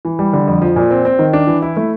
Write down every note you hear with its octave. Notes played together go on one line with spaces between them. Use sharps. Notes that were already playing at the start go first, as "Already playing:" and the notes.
E3
G3
D3
F2
F3
A#2
C4
C4
D#3
D4
E3
E4
A3